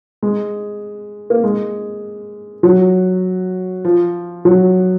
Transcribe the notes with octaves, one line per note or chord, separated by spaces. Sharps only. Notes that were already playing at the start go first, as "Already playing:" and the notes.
G#3
A#3
G#3
F#3
F3
F#3